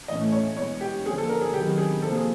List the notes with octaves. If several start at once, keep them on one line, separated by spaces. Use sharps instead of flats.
A2 E3 A3 C#4 D#5
C#5
B2 G#3 B3 C#5
G4
D3 F3 A#3 C#4 G#4
A4
A#4
G#4
C3 D#3 F#3 B3 G4
G#4
C3 F3 A#3 A4
G#4